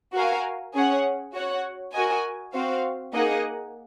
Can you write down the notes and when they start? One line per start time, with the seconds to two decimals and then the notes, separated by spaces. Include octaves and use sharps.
0.14 F#4 A#4 F5 G#5
0.74 C#4 G#4 C#5 F#5
1.34 F#4 C#5 F#5
1.93 F#4 A#4 D#5 G#5
2.54 C4 F#4 C5 F5
3.13 A#3 D#4 G#4 D#5 F#5